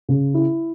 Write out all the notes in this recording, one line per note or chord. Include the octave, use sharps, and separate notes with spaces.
C#3
E4